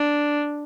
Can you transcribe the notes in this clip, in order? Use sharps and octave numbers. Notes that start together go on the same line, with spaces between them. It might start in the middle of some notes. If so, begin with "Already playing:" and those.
Already playing: D4